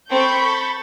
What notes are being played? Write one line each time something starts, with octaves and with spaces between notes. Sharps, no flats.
C4 A4 B5 C#6 G6
A4